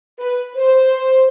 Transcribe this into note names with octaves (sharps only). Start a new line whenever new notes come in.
B4
C5